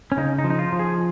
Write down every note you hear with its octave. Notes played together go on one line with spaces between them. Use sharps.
C#4
C#3 D#4
D#4
F3
D#4
F4
F3
G#4